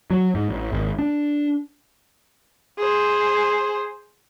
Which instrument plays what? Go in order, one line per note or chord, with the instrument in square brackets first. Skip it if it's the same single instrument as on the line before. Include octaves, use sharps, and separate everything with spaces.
[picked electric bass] F#3
G#2
A1
G#1
D4
[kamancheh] G#4 C5